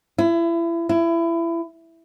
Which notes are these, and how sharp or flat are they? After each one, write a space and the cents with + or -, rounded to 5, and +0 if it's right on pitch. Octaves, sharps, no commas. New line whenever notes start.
E4 +30
E4 +25